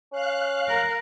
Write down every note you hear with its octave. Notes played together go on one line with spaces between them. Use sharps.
C#4 F5 F#6
A#4